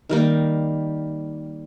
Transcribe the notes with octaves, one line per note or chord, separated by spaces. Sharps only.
D#3 G3 A#3